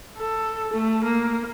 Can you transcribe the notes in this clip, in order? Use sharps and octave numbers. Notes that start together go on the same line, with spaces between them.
A4
A3
A#3